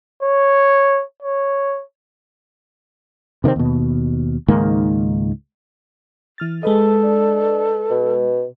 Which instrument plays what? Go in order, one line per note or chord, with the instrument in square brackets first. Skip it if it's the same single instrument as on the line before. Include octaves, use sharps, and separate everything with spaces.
[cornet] C#5
C#5
[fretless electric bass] C3 D#3 A3 C4
D#2 B2
C#2 G#2 D#3 A#3
[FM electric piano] E3 F6 A6
[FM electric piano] G#3 B4 D#5 [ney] A4
[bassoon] D4
B2